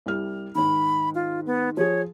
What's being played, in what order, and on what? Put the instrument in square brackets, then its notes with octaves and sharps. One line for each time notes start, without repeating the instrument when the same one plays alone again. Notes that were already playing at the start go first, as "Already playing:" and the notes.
[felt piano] C2 G3 F6
[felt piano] G#2 D#3 [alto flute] B5
[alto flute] F4
B3
[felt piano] F3 G#4 [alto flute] C#5